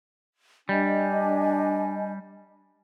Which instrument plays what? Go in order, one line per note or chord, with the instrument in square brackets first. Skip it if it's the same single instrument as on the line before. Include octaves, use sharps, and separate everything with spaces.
[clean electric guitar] G3 [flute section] D4 D#5 G#5